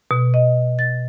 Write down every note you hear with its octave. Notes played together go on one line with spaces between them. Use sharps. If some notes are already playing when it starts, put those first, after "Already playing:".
B2
D#5
A6